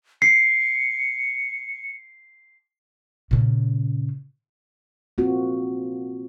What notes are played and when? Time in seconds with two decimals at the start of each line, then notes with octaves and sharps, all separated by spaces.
0.22 C7 C#7
3.31 A#2 C#3
5.18 A#3 C4 F4 F#4